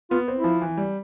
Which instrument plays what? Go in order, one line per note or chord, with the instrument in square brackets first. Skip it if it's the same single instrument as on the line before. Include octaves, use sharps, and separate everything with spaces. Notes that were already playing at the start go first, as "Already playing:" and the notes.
[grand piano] B3 [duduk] F4
[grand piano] C4
[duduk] E4
[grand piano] F3
E3
G3